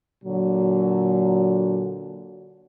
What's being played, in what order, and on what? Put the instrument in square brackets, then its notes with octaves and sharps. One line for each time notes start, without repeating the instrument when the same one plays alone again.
[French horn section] A#2 D3 F#3